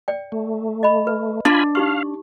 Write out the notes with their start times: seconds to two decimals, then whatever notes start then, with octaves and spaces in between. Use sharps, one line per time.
0.08 D5 G5
0.32 A3
0.83 D#5 B5
1.07 B4
1.45 D4 F4 G#5 B5
1.75 D#4 G4 F5 C#6